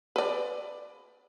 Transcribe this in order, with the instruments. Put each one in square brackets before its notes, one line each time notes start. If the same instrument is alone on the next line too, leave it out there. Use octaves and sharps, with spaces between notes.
[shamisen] B4 D5